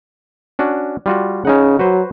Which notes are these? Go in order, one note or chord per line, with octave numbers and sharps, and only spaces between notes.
C#4 D4 F#4
G3 F4 F#4
C#3 C#4 D#4 F#5
F#3 F#4 B4 C5